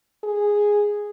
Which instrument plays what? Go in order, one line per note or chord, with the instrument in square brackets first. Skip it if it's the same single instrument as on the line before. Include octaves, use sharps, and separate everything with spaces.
[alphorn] G#4